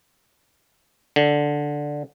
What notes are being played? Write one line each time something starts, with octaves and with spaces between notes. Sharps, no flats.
D3